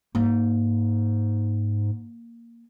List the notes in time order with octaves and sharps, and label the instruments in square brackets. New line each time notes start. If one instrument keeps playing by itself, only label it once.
[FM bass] G#2 [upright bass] A#3